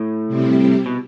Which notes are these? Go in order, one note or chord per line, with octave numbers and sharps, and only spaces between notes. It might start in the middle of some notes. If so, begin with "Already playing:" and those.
Already playing: A2
C3 G3 C4 E4 G4
B2